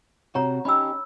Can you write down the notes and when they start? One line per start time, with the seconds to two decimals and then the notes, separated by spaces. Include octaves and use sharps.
0.35 C3 F#4 C#5 A#5
0.65 C#4 D#4 G4 B5 E6